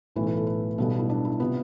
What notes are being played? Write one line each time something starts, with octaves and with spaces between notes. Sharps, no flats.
B1 A2 E3 A3 B4
B4
A4
B4
B1 B2 G3 B3 A4
E4
D4
E4
C3 G3 B3 F4